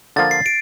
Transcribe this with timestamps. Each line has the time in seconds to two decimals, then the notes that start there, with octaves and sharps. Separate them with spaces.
0.16 D3 F3 A#3 F4 A6
0.31 C7
0.46 D7